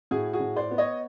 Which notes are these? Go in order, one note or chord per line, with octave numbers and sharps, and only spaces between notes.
A2 F#4 G#4
F#4 G#4
A2
C5 D5
B3
C#5 D#5